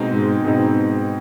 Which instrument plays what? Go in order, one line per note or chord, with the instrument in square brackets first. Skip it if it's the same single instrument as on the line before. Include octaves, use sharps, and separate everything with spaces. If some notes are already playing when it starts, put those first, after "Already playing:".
Already playing: [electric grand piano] B2 G#3 C4 D#4
[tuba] G#2
[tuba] G#2 [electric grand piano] B2 G#3 C4 D#4